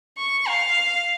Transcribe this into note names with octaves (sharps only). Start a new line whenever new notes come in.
C#6
F5